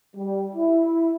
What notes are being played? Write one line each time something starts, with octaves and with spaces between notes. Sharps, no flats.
G3
E4